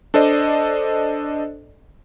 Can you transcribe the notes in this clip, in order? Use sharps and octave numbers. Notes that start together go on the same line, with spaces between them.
D4 A4 C5 D5 D#5